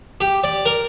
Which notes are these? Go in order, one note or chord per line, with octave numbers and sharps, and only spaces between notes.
G4
D5
A#4